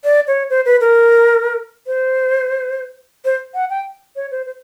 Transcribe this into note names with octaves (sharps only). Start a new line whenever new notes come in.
D5
C#5
C5
B4
A#4
C5
C5
F#5
G5
C#5
C5
C5